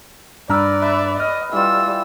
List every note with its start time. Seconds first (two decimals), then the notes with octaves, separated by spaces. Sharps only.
0.50 G2 D4 A#4 B4 D5 E6
0.82 B4 E5
1.20 D#5 F6
1.53 E3 G3 F4 E6